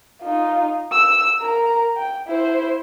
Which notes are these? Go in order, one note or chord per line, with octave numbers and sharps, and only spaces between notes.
D#4 F4
E6
A#4 A#5
G5
E4 C5